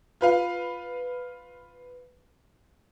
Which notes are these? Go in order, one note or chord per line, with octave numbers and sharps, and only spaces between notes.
F4 B4 F5